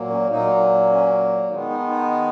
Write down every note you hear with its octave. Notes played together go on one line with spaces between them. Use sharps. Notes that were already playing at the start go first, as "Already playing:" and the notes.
Already playing: A#2 F#3 A#3
C#4
A#2 F#3 A#3 D#4
C#4
D#3 G#3 B3 D#4
D#4
D#4